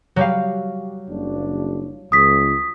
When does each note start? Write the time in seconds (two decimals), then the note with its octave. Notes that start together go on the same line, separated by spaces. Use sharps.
0.16 F#3 G3 F5
1.09 F#1 D4
2.12 C#2 D#6 B6